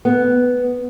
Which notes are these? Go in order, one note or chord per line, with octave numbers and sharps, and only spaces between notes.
B3